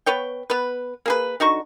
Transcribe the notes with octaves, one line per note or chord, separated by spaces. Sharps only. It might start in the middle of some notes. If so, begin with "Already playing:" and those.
B3 B4 C#5 G5
B3 B4
A#3 G#4 B4
D3 D#4 F#4 C#6